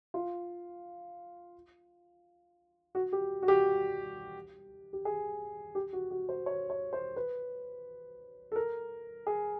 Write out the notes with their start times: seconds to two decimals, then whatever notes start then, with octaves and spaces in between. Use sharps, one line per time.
0.14 F4
2.95 F#4
3.13 G4
3.42 F#4
3.48 G4
4.93 G4
5.05 G#4
5.75 G4
5.93 F#4
6.11 F#4
6.29 C5
6.46 C#5
6.70 C#5
6.93 C5
7.16 B4
8.52 A4
8.56 A#4
9.27 G#4